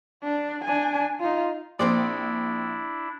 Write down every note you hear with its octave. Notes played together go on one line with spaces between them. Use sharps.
D4
D4 G#5
D#4 F4
A#1 C4 D4 E4 C5 D5